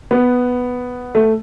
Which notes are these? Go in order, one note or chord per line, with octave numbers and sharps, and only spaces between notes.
B3
A3